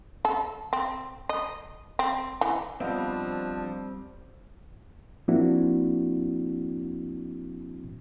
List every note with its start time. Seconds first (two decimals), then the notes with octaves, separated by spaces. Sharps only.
0.25 A4
0.73 C4
1.29 D#5
1.99 C4
2.41 E3
2.80 F3 G3 B3 C4 D4 D#5 F5
5.28 F3 A#3 C4 D4 E4 F#4